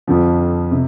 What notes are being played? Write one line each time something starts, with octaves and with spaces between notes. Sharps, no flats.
F2 D3 F3
C3